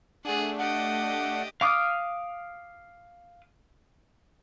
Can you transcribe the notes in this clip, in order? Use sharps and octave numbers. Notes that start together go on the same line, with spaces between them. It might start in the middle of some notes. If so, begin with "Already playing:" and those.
A3 D4 G#4 F#5
G4 D#5 F#5
F5 D6 D#6 F6